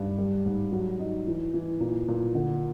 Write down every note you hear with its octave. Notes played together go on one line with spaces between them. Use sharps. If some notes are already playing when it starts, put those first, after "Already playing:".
Already playing: G2
G3
G#2
F#3
D#4
E3
E3
A#2
A#2
D3